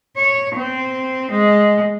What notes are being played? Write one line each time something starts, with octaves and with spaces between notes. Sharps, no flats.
C#5
C4
G#3